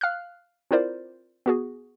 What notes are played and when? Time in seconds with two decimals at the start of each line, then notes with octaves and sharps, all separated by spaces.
0.01 F5 F6 F#6
0.71 C4 E4 F4 A#4 C5 D5
1.46 B3 F#4 G#4